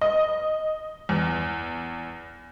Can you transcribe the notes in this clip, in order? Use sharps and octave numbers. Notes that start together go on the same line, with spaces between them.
D#5
E2